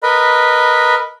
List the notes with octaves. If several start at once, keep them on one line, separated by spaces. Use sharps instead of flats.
A#4 B4 D#5 B5